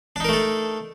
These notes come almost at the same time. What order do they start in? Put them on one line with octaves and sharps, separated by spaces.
D4 D#4 A#4 A3 A4